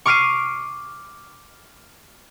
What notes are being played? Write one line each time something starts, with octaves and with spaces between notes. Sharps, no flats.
C#6 D6 F6 C7 D7 D#7